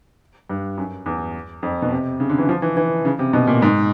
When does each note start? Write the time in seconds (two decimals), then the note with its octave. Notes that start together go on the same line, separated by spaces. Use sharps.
0.50 G2
0.78 F#2
1.06 E2
1.63 F2
1.82 B2
1.92 C3
2.20 C#3
2.30 D3
2.38 E3
2.49 F3
2.62 E3
2.77 E3
3.05 C#3
3.19 C3
3.33 B2
3.47 A#2
3.62 G#2